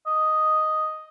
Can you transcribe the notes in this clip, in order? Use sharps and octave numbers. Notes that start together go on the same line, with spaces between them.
D#5